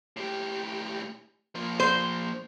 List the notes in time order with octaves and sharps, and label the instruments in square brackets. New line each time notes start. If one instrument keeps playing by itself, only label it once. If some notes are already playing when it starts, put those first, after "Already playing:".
[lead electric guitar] A2 G4
F3 A#3
[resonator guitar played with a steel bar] C5